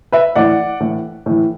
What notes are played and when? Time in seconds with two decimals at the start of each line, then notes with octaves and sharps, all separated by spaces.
0.12 B4 E5
0.36 A2 E3 D5 F#5
0.80 A2 E3
1.26 A2 E3